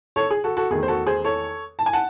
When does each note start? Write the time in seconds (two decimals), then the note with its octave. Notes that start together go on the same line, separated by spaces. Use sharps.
0.16 A4 C#5
0.31 G#4
0.44 F#4 A4
0.57 F#4 A4
0.70 E2 D#3 A3 G#4
0.83 C5
0.88 F#4 A4
1.07 G#4 C5
1.24 A4 C#5
1.79 A5
1.86 G#5
1.93 F#5 A5